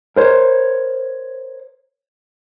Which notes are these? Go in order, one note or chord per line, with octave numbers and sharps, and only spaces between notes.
A#4 C5 C#5